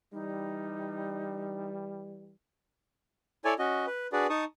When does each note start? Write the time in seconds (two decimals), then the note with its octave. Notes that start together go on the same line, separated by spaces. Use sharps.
0.13 E3 G3 D#4
3.45 E4 A4 C#5 D5 G#5
3.59 C#4 F#4 D#5
3.87 B4
4.12 D4 F#4 G#4 B4 D5
4.30 D#4 A5 C#6 D#6